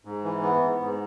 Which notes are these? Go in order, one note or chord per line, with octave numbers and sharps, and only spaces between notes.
G#2
E3
B3
G#2
G#2